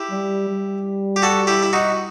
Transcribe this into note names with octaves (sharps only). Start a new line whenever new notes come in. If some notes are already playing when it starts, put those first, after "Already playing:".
Already playing: E4 G4
G3
G3
G4
F#4 A4
E4 G4
E4
D#4 F#4